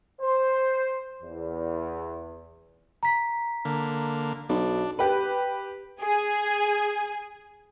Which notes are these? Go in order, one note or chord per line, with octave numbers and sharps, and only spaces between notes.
C5
E2
A#5 B6
D3 A#3
B1 D4
G4 B4
G#4 G#5